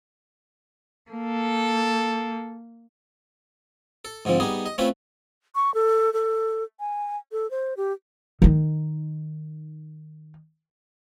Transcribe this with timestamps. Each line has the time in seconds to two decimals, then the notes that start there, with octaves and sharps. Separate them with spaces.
1.11 A#3 A4
4.05 A4
4.25 G#2 D3 F3 C4
4.40 G3 B3 D#4 G#4
4.66 D#5
4.78 A3 C4 C#4 E4 F4 B4
5.55 C#6
5.74 A4
6.13 A4
6.80 G#5
7.32 A4
7.51 C5
7.77 G4
8.42 D#3 D#4